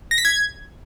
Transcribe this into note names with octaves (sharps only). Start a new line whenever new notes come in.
A#6
B6
G#6